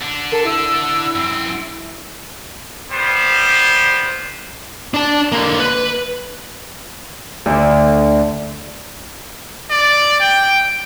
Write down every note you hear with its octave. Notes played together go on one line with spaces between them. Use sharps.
D3 D4
A4 A#4
E4 E6
F#2 C4
G3 B3 C5
D4 A5
D3 A#3
B4
D2 D3
D5
G5